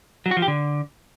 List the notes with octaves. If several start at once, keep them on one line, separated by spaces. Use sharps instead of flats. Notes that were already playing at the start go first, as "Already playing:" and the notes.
F#3
F#4
F3
G4
D3